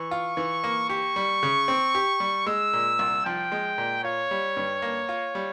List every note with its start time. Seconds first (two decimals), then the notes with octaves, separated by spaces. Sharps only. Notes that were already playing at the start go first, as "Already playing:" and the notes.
Already playing: E3 C#6
0.11 F4
0.37 E3
0.64 A#3
0.89 G4 C#6
1.16 G3
1.43 C#3
1.68 C4
1.95 G4
2.20 G3
2.46 G#3 E6
2.73 A#2
2.99 C2
3.25 F3 G5
3.52 G#3
3.78 A#2
4.04 F4 C#5
4.31 G3
4.57 G2
4.82 A#3
5.09 F4
5.35 G3